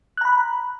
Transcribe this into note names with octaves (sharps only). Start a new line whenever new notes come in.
A#5 B5 F#6